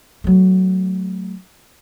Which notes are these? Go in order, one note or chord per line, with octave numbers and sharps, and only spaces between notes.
F#3 A3